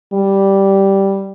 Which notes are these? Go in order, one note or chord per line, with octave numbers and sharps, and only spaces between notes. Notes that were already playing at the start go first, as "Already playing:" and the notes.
G3